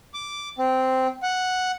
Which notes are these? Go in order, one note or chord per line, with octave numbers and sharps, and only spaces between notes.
D6
C4
F#5